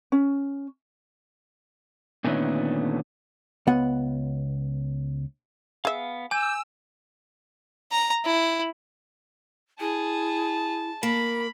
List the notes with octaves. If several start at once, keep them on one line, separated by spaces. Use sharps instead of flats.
C#4
A#2 D3 D#3 A3 B3 C#4
C#2 B3 F#5
B3 G#4 E5 F5
G#5 D6 E6 G6
A#5
E4
E4 G#4 A5
A#3 B5